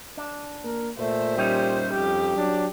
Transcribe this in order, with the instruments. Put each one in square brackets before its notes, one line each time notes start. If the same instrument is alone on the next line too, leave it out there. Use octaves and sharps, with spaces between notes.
[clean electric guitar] D4
[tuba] A#3 [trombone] A#4
[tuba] A#2 [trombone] A3 [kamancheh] C5 E5
[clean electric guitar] G3 C#4 D#4 [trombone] G4
[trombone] F2 [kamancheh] G4
[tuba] F#3 [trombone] D4